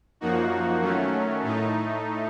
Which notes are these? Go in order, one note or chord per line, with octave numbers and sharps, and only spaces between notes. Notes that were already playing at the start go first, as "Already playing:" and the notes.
F#2 F3 A#3 D#4 F#4
D#3 F#3 A3 C#4
A2 A3 D#4